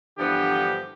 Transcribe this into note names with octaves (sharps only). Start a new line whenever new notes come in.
G2 D3 E3 F3 B3 G4